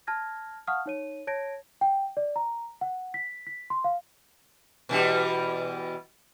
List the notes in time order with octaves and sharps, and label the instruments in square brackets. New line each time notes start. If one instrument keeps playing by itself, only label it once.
[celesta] A5 F6 G#6 A#6
F5 F#5 A5 C#6 D#6 F6
D#4 C#5 D#7
C#5 A5 G#6 A#6 D7
G5
D5
A#5
F#5
B6
B6
C6
F5
[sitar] B2 E3 G3